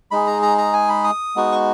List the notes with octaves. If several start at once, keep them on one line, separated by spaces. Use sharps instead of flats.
G#3 D#4 G#4 B5
A#5
A#5
A#5
G#5
B5
D#6
G#3 B3 D#4 F#4
C#6